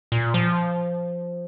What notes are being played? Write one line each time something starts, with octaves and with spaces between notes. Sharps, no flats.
A#2
F3